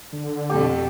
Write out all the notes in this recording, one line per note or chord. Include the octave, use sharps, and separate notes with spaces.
D3
F2 B2 G4 A4